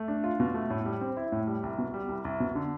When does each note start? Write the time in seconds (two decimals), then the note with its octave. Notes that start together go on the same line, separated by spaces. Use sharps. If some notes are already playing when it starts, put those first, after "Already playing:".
Already playing: A3
0.08 D4
0.24 F4
0.40 B2
0.55 A3
0.70 A2
0.85 G3
1.01 C4
1.17 E4
1.32 A2
1.47 G3
1.63 C2
1.78 B2
1.94 G3
2.09 C2
2.25 C2
2.40 B2
2.55 D3